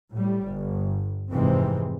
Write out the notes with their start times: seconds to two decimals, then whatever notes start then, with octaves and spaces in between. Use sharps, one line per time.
0.13 A2 G3
0.46 G1
1.31 F1 G#2 C3 E3 C4